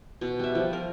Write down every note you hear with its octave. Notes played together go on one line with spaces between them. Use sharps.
B2
G3 E5
F3
A#4